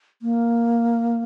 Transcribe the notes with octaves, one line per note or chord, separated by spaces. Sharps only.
A#3